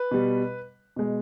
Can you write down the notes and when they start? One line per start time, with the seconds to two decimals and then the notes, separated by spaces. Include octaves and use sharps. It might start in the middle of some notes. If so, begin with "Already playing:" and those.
Already playing: B4
0.11 B2 G3
0.96 B2 G#3